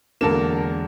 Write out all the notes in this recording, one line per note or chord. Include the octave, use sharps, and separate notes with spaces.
E1 D3 A#3 A4 A#4 E7